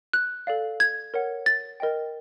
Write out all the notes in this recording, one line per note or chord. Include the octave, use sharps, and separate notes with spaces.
F#6
A4 D5 F5
G#6
A#4 C#5 F#5
A6
A#4 D#5 G5